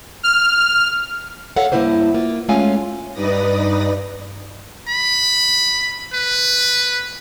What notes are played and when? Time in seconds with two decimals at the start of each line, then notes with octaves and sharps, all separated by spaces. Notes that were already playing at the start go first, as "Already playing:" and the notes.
0.23 F6
1.56 A4 C#5 F5 F#5
1.72 G2 A3 A#3 E4 B4 C5
2.14 A#3 F4
2.49 G#3 A3 C#4 F4 F5 G#5
3.14 G2 D#4 B4 D5 D#6 A#6
4.88 B5
6.13 B4